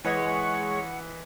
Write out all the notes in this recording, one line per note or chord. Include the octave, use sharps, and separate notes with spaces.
E3 G#3 B4 C#5 D#5 F#5